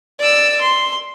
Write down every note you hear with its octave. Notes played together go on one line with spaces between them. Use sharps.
D5 E6
C6